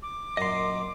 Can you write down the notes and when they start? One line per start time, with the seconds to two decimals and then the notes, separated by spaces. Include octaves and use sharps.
0.02 D6
0.37 F#2 A#2 D#5 C6